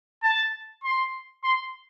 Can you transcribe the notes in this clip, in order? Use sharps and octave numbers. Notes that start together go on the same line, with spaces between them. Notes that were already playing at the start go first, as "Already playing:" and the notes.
A5
C6
C6